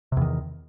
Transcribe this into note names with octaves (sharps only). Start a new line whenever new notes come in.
E2 C3 D#3